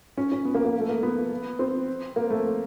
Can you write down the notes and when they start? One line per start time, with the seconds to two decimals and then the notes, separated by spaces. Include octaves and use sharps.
0.18 C#4
0.32 C#4
0.45 B3
0.54 A#3
0.65 A#3
0.80 A3
0.89 A#3
1.03 B3
1.59 C4
2.16 A#3
2.30 A3